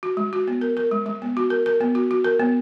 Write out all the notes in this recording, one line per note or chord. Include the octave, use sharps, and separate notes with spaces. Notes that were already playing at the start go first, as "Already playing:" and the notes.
F#4
G#3
F#4
B3
A#4
A#4
G#3
G#3
B3
F#4
A#4
A#4
B3
F#4
F#4
A#4
B3